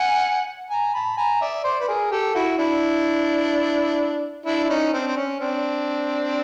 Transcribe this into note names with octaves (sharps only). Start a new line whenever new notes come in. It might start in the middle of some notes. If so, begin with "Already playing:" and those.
Already playing: F#5 G#5
G#5 A#5
A5 B5
G#5 A#5
D5 E5
C5 D5
B4
G#4 A#4
G4 A4
E4 F#4
D4 E4
D4 E4
E4
C#4 D#4
C4 D4
C4
C#4
C4 D4